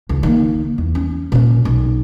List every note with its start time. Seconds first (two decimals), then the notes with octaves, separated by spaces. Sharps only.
0.09 C#2
0.23 D#3 A#3
0.78 E2
0.95 C#4
1.32 A#2 C#4
1.65 B1